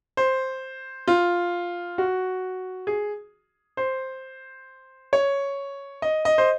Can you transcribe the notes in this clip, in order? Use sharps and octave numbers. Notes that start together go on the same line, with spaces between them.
C5
F4
F#4
G#4
C5
C#5
D#5
D#5
C5